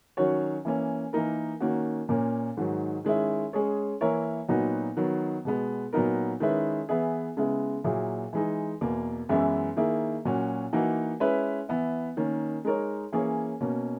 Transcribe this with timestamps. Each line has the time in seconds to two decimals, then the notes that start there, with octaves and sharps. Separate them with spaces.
0.17 D#3 F#3 C#4 F#4 C#5
0.65 E3 A#3 C#4
1.13 E3 A#3 D#4 A#4
1.60 D#3 A#3 C#4 F#4
2.09 A#2 A#3 C#4
2.57 G#2 D#3 F#3
3.05 D#3 G#3 C#4 E4
3.53 G#3 C#4 G#4 C#5
4.01 E3 A#3 E4 A#4 C#5
4.48 A#2 F#3 B3 D#4 F#4
4.97 D#3 F#3 B3
5.45 B2 G#3 B3
5.93 A#2 F#3 B3 D#4 A#4
6.40 D#3 G#3 C#4 E4 B4
6.89 E3 B3 E4 G#4
7.37 C#3 G#3 B3 E4
7.84 A#2 F#3 A#3 E4 G#4
8.33 E3 G#3 D#4
8.81 E2 B2 A#3
9.29 F#2 E3 G#3 B3 E4
9.77 D#3 A#3 E4 G#4
10.25 A#2 F#3 C#4 F#4
10.73 E3 A#3 D#4 F#4
11.20 G#3 C#4 E4 B4
11.69 E3 B3 E4
12.17 D#3 A#3 C#4
12.65 G#3 D#4 A#4 C#5
13.12 E3 A#3 C#4 G#4 C#5
13.61 B2 A#3 C#4